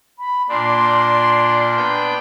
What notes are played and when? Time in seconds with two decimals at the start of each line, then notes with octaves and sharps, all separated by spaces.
0.19 B5
0.49 A#2 D4 C6
1.77 B3 D4 G5